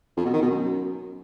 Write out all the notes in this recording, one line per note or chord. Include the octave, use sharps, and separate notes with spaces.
F2
B2
D#3
B2
F#2